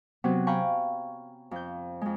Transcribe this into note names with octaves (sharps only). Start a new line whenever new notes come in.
C3 F#3 B3 C4
F5 G5 G#5 A#5 B5 C#6
F2 G6
F2 G#3